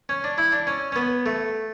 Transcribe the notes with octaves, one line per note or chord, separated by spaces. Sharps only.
C#4
D4
E4
D4
C#4
C#4
B3
A3